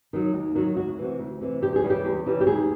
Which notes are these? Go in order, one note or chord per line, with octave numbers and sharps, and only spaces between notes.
D#3 F#3
D#2
D#3 F#3 F#4
D2 F#4
C3 E3
D2
C3 E3
E2 G4
G#4
C#3 E3 G3
G4
E2
C#3 E3 G3
G4
D#2 G#4